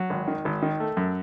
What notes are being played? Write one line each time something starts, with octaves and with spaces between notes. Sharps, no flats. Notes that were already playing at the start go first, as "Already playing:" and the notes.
Already playing: F#3
G#1
D#3
G#1
D#3
A3
F#2